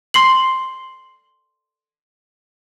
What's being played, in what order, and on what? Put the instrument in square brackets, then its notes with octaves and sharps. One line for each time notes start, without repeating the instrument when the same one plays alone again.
[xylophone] C6 C7 F#7